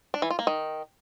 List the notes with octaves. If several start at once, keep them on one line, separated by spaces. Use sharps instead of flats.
D4
E3
F4
A#3
D#3